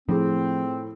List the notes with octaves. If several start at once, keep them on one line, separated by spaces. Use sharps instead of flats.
A2 F3 C4 F4 G#4